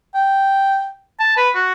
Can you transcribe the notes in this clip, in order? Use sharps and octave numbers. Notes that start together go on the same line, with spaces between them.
G5
A5
B4
F#4